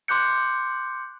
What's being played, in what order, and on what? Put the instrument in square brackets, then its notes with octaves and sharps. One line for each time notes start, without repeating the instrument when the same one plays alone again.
[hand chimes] C6 D6 F#6 G6 C#7